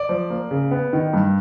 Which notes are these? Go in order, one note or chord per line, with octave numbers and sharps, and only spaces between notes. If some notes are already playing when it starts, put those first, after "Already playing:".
Already playing: D5
F3
A#3
C#3
B3
D#3
G2